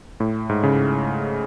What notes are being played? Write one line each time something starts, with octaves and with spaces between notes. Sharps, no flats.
A2
G#2
C#3